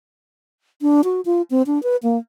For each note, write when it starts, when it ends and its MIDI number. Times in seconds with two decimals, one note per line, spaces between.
0.82 1.02 62
1.04 1.21 66
1.25 1.42 65
1.51 1.62 60
1.67 1.81 62
1.83 1.96 71
2.03 2.17 58